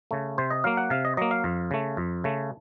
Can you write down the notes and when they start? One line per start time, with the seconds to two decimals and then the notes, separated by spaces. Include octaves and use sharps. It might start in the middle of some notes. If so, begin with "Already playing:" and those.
0.11 C#3 A3
0.38 C3 C5
0.50 D#5
0.64 F#3 A#3 F5
0.77 F#5
0.90 C3 F5
1.05 D#5
1.17 F#3 A#3 D#5
1.31 F5
1.44 F2
1.71 C#3 A3
1.97 F2
2.24 C#3 A3